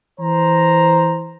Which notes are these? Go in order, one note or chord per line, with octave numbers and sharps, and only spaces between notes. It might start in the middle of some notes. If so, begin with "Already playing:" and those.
E3 C5 A#5